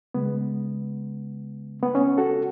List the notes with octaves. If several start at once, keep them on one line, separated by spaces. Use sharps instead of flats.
C#3 G#3 B3
B3
C#4
F#4 A4